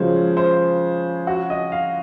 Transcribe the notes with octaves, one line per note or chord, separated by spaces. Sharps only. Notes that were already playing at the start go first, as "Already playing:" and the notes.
Already playing: C#3 F3 G#3 C#4 F#4 C5
C5
F#4
D#5
F5